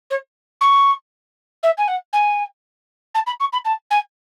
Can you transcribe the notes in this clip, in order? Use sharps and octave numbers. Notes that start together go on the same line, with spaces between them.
C#5
C#6
E5
G#5
F#5
G#5
A5
B5
C#6
B5
A5
G#5